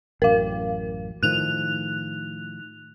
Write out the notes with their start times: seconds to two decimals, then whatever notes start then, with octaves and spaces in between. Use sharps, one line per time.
0.22 A1 F#2 A#4 F5
1.23 A2 D#3 F3 F#6 F7